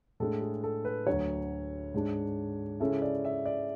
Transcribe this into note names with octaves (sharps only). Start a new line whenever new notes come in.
A2 G#3 D4 A4
G#4
A4
B4
D2 D3 F#3 C#5
G#2 G#3 D4
C#3 G#3 C#4 E4 A4
D5
E5
D5